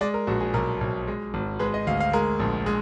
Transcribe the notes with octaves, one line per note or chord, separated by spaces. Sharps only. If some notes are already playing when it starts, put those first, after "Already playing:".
G#3 D5
A#4
A#1 F#4
G#4
B1 A#4
B1
G#3
G#1
G#3 B4
D#5
D2 F5
F5
G#3 A#4
A#1
G#3